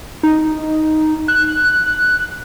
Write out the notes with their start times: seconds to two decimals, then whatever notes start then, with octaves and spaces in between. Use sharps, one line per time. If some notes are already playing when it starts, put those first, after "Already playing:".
0.23 D#4
1.28 F#6